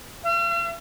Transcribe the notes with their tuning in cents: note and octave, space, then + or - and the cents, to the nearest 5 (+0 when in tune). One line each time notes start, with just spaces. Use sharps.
F5 -45